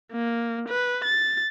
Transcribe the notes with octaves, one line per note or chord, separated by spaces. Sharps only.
A#3
B4
A6